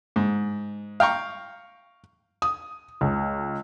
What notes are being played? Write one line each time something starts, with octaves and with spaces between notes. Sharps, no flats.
G#2
F5 G5 A#5 C#6
D#6
C#2